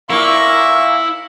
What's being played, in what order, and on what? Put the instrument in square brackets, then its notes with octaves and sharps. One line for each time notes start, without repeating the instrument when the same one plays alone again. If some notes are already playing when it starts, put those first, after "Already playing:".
[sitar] A#2 A#3 [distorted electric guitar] E4 [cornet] E5 [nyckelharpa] C#6